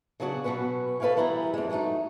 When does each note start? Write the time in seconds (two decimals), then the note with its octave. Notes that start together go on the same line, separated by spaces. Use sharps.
0.20 C#3 F#3 B3 D4 F#4 G#4
0.44 B2 F#3 C#4 F#4 B4
1.00 A4 B4 D5 F5 G5 G#5
1.16 F#2 E3 G3 B3 E4 A#5
1.54 F2 E3 G#3
1.69 E3 F#3 G#3 A3 D#4